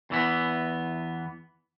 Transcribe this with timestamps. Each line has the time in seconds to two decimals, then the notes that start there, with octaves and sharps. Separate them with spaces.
0.10 E2 E3 B3